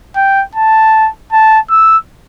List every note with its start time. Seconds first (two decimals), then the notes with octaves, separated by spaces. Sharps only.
0.16 G5
0.55 A5
1.33 A5
1.70 E6